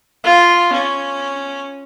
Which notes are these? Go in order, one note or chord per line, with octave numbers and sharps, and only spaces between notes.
F4
C#4